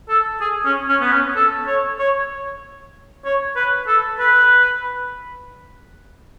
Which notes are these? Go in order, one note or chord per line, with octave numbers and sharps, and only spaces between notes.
A4
G#4
C#4
C#4
B3
C#4
A4
C#5
C#5
C#5
B4
A4
B4